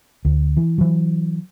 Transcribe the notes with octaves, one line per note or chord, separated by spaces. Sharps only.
D2
E3
E3 F#3